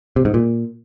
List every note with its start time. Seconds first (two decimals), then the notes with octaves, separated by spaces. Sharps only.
0.16 C3
0.25 G#2
0.34 A#2